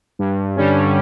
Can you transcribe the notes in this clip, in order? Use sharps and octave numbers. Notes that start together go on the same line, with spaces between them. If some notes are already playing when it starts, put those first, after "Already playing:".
G2
D3 G3 C#4